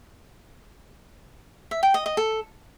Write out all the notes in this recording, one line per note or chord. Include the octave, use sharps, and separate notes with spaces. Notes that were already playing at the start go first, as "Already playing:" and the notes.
E5
G5
D#5
D#5
A4